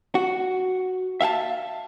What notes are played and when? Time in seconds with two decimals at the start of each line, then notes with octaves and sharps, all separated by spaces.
0.15 F#4
1.21 E5 F5 G5 A5